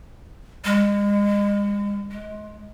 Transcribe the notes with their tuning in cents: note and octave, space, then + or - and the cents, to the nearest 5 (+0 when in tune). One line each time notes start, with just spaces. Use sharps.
G#3 -35
G#3 +25